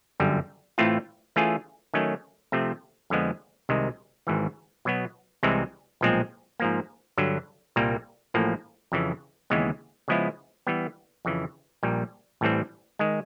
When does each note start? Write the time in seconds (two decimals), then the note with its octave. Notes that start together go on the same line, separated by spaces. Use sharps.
0.20 G1 F#2 D3 G3
0.78 A2 E3 A3 C4 F4
1.36 E3 A3 C#4 F4 G#4
1.94 D#3 F#3 A3 C#4
2.52 C3 F3 A3 C4
3.10 F2 D3 F3 G#3 B3
3.69 C2 C3 D#3 G#3
4.27 G#1 G#2 E3
4.85 B2 F#3 B3
5.43 C2 C3 E3 G#3 C4
6.01 B1 A#2 F3 G#3 C4
6.60 G#2 F3 A#3
7.17 G2 D3 F#3
7.76 C2 A#2 G3 A#3
8.34 A1 A2 F3 A#3
8.92 F2 C#3 E3
9.50 D#2 C#3 E3 G#3 B3
10.08 C#3 F3 G#3 B3 E4
10.67 E3 G3 B3
11.25 F2 C#3 E3
11.83 A#1 A#2 G3
12.41 A1 A2 E3 G3 C4
12.99 D#3 G#3